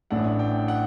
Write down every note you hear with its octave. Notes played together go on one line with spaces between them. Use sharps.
A1 A2 A3 D4 F#5
G5
F#5